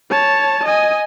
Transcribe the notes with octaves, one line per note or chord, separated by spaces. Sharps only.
C#5 A5
D#5 G#5